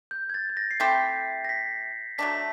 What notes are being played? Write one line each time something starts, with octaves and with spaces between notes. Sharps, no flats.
G6
G#6
A6
A6
A#6
C7
A3 C4 E4 G4 B6
A#6
B6
F#3 A3 D4 B6